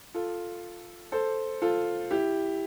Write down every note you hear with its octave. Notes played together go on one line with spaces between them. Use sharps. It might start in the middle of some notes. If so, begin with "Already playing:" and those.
F4 A4
A4 C5
F4 A4
E4 G4